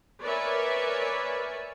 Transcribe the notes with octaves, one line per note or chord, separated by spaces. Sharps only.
A#4 B4 C#5 D5 E5 G#5